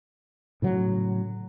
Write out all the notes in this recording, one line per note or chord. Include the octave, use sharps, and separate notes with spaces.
A2 C#3 F#3